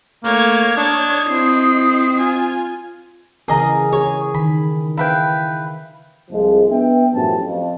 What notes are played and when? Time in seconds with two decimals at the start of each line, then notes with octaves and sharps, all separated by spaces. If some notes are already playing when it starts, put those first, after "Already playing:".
0.24 A3 A#3 C#5 G#6
0.77 D4 D#5
1.29 C4 E4 C7
2.17 F4 G#5
3.48 C#3 E3 G#4 A#4 D#5 A#5
3.93 G#4 C#5
4.34 D#3 B5
4.97 E4 B4 F5 G5
6.31 C2 F3 G#3
6.69 B3 D4 B4 E5 G5
7.14 F#2 A2 E3 F3 G4 A5
7.43 F2